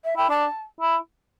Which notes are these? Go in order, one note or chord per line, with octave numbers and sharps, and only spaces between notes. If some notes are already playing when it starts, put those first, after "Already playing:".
E5
E4 G5
D4 A5
E4